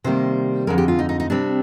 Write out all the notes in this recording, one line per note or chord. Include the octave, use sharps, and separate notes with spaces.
C3 D#3 G3 A#3 C5
F2 D3 G#3 A#4
G4
F4
D#4
D#4
D#4
C3 G3 C4 D4